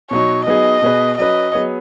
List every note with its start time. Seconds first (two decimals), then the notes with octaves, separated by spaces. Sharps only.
0.11 B2 F#3 D#4 C#5
0.46 F#3 B3 D#4 G#4 D#5
0.82 B2 B3 G#4 B4
1.18 F#3 C#4 B4 D#5
1.53 F#3 B3 G#4 C#5